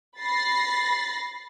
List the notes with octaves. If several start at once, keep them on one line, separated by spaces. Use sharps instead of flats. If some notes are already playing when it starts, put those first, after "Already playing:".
B5 A6 A#6 C7